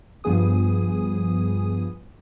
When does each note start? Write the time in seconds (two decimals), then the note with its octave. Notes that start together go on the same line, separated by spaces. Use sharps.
0.24 G2 F3 B3 G#4 D#6